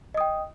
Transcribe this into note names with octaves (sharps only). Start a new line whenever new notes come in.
D#5 G5 D#6